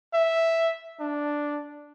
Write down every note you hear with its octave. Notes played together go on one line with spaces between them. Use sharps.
E5
D4